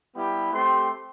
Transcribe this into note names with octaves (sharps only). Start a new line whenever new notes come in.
G3 B3 E4 G4 B5
A3 C4 G4 C6